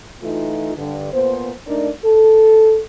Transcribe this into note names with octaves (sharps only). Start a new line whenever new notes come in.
E3 A3 D#4 F4
G2 D3
A#2 B3 C5
A3 D4 D#4 A#4 D5
A4